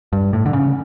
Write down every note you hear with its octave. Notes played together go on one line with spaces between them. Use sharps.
G2
A2
D3
C#3